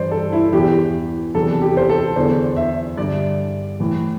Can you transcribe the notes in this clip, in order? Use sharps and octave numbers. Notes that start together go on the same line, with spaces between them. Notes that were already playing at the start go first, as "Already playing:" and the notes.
Already playing: G2 E3 C5 D5
A4
E4
E2 E3 G4
E2 C3 E3 A4
G4
C5
A4
E2 D3 C5
E5
G2 D3 D5
A2 E3